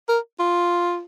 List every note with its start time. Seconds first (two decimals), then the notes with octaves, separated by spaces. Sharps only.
0.08 A#4
0.40 F4